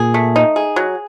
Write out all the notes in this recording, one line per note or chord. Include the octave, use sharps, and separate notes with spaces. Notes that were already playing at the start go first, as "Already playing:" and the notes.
Already playing: A#2 G#4
A3
D#4
G#4
F#3